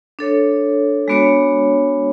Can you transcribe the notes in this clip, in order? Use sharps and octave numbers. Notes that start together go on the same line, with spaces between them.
D4 A4 C#5
G#3 B3 D4 F#4 C#5